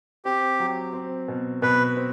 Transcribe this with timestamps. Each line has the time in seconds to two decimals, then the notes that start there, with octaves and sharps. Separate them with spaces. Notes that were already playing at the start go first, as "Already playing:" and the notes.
0.25 C4 G4
0.60 F#3
0.93 C4
1.28 B2
1.62 B2 B4
1.97 C4